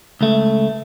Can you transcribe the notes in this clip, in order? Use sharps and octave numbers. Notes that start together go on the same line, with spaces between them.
C#2 A3